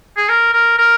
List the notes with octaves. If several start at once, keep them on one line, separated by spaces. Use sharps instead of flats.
G#4
A#4
A#4
A#4